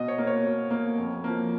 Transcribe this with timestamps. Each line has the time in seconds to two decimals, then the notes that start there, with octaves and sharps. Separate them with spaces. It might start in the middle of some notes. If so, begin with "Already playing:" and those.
Already playing: B2 D#5
0.08 C#5
0.18 A#3
0.27 C#5
0.44 B2
0.71 A#3
0.98 F2
1.24 F3 A#3